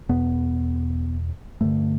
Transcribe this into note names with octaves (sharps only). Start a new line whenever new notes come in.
E2 B2 B3
G2 D3 A3